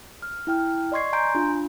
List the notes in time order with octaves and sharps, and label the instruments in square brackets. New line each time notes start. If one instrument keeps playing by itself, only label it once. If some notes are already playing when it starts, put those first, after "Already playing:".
[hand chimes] F6
E4 G5 F6
D5 D#5 C6 C#6 G#6 C7
G#5 A#5 C6 G6 D7
D4 F4